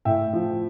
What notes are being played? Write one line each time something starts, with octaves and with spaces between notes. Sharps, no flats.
A2 E5 G5
F3